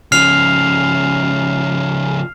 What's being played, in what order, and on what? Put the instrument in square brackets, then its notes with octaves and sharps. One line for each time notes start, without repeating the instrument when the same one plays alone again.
[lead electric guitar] C#3 F3 [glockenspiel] F6 C7 F7